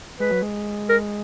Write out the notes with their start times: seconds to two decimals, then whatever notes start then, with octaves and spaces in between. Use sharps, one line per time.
0.20 G#3 B4
0.31 F#3
0.42 G#3
0.89 A#4